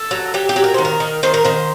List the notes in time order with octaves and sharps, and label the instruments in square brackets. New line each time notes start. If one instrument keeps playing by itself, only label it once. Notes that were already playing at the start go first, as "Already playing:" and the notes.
Already playing: [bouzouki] A4
F#3
F#3 G4
G4
F#3
A#4
D#3 C5
A#4
D#3
D#3 C5
A#4
D#3 C5